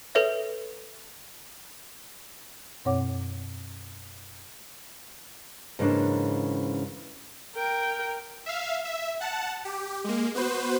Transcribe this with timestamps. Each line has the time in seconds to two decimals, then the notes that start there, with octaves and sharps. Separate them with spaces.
0.15 A4 B4 C#5 E5
2.85 F#2 B2 C4 C#5 F#5 D6
5.79 G#2 C#3 E3 A#3 D4
7.55 A#4 G5
8.46 E5 F5
8.85 E5
9.20 F#5 A5
9.65 G4
10.04 G#3 A#3
10.35 B3 F#4 B4 C5